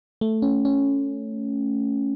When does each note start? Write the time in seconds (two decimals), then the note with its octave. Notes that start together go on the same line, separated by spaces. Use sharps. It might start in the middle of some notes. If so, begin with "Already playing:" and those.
0.21 A3
0.42 C#4
0.65 C#4